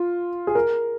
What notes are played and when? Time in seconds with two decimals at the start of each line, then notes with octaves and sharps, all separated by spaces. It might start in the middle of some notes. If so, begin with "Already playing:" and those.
Already playing: F4
0.47 G#4
0.55 A#4